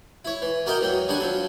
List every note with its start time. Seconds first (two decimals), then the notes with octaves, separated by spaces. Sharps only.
0.25 E4 C#5
0.42 E3
0.66 F#4 A#4 D5 D#5 G5 A#5
0.81 E2 F#3 G5
1.08 F#3 G3 D4 F#5 G#5
1.20 F3 F#3 A4